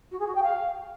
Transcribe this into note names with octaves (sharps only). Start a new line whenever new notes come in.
F#4
G#4
F#4
G5
F5